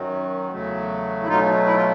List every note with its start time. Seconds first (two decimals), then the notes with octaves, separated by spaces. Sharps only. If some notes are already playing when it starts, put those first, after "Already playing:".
Already playing: F#2 D#3 F#3
0.52 E2 C#3 F#3 A3
1.23 E4
1.28 B2 F#3 A3 D#4 F4
1.66 E4
1.76 F4